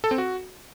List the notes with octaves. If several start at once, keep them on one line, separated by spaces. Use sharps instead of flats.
A4
C4
F#4